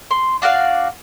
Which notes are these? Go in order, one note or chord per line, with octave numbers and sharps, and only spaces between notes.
C6
D4 F#4 D5 F5